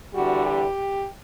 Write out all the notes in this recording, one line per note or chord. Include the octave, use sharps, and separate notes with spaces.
E2 D3 G3 F#4
G4